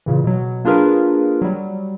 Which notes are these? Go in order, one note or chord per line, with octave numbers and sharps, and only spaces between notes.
A#2 C#3 E3
B2 F#3
A#3 D4 F4 G#4 A#4 B4
F#3 G3